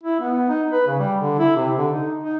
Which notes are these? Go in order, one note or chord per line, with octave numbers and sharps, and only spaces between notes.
E4
B3
D#4
B4
C#3
G3
D3
E4
C3
D3
D#4
D#4